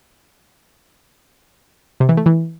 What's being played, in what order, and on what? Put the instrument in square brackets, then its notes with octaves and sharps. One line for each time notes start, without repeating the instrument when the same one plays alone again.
[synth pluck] C3
E3
A3
E3